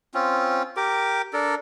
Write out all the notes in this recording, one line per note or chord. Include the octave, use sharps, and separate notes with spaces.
C4 C#4 F4
G4 A#4 D6
D4 A4 A#4